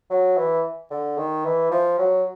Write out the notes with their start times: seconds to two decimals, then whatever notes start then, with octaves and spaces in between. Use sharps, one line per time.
0.10 F#3
0.37 E3
0.91 D3
1.17 D#3
1.45 E3
1.71 F3
1.99 F#3